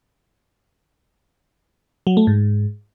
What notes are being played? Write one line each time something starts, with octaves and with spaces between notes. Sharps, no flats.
F#3
A3
G#2